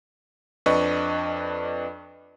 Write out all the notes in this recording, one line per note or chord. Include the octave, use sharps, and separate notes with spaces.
F2 D4 B4 D#5 C#6